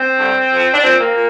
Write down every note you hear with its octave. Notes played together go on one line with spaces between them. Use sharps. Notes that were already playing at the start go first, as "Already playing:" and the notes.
Already playing: C4
G2 D3 G3
F2 F3
D4
A#2 F3 C4
A#3
A#2